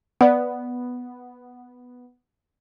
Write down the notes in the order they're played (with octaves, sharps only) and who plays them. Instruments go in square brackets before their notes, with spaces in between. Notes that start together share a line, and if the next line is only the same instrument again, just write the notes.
[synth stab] B3 [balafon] D5 F#5